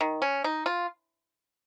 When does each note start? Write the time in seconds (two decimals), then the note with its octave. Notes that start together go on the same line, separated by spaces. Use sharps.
0.01 D#3
0.22 C#4
0.44 D#4
0.66 F4